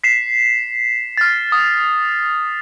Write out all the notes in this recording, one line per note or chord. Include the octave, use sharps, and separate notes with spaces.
B6 C7 E7
F6 A6
D#6